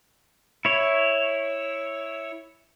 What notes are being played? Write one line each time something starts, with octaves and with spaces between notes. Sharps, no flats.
E4 C#5